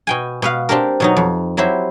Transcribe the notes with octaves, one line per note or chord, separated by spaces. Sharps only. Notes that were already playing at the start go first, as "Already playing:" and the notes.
B2 G5 G#5
B2 B4 F5
C4 D4 G4 A#4
B2 F#3 D#4
F2
F#3 C4 E4 G4 C5